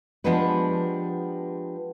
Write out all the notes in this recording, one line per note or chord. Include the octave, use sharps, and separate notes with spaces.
F3 G#3 B3 D4 G4 B4